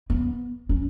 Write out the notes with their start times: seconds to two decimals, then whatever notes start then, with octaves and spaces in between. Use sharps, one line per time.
0.10 B3
0.69 C#4